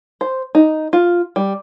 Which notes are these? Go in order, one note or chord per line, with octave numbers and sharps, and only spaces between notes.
C5
D#4
F4
G3